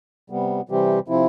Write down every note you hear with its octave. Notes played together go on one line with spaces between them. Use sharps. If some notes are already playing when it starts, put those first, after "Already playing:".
C3 G3 B3
C3 E3 G3 C4 G4
C3 F3 C4 E4